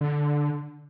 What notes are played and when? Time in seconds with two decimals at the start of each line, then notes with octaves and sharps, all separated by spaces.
0.01 D3